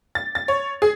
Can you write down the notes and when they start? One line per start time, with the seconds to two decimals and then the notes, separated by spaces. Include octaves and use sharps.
0.15 A6
0.35 A6
0.48 C#5
0.82 G#4